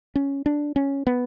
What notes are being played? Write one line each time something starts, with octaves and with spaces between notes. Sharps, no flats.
C#4
D4
C#4
B3